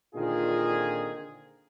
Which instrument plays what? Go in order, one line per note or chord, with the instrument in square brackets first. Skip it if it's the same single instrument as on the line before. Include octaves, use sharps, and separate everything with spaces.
[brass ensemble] A#2 D3 D#3 C4 F4 G#4